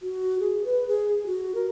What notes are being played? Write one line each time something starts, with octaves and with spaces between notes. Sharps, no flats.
F#4
G#4
B4
G#4
F#4
A#4